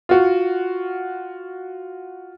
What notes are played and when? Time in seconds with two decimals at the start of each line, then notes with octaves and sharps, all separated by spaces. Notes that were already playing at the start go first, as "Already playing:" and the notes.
0.09 F4 F#4